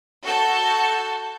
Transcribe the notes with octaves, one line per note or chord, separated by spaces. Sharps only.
F#4 A4 A5 G6